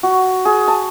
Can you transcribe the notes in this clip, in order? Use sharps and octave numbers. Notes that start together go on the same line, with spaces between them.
F#4
G#4
A5